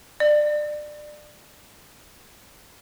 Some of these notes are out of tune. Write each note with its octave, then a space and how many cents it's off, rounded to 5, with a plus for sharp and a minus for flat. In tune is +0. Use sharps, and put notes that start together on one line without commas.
D5 +25